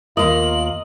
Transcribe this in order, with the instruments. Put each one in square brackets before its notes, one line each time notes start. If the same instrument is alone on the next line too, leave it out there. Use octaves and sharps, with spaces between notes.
[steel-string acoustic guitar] D#2 A#3 A#4 [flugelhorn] F4 [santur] D#5 [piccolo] F#7